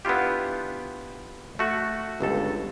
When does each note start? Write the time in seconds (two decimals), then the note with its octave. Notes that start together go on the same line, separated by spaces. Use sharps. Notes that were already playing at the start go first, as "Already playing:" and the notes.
0.05 B3 D4 E4 F4 G4
1.59 A3 F#4
2.21 G1 C#2 A4